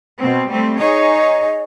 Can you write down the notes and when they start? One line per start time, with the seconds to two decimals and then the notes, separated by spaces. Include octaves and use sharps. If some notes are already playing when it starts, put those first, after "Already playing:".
0.19 B2 C4
0.50 G3 A3 C4
0.79 D#4 G#4 C#5 D#5